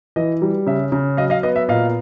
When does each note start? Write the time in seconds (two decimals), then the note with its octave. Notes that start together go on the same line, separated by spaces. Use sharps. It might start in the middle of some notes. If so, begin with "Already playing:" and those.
0.16 E3 D#5
0.42 G3
0.67 C#3 E5
0.92 C#3
1.17 F#3 D#5 F5
1.30 D#5 F5
1.43 B3 D#5
1.56 E5
1.69 A#2 D#5 F5